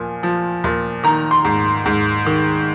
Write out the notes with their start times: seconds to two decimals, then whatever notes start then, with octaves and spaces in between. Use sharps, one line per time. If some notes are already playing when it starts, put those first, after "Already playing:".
Already playing: A#2 F3 G#5
0.23 F3
0.64 A#2
1.04 D#3 A#5
1.31 C6
1.44 G#2
1.85 G#2
2.26 D#3